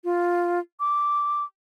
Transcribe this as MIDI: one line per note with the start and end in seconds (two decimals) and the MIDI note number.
0.04 0.59 65
0.80 1.44 86